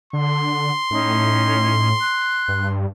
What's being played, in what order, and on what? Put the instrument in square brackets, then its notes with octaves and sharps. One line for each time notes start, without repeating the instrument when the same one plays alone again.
[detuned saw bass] D3 [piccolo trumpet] C6
[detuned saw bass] A2 [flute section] C#4 D#4
[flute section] F#6
[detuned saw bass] G2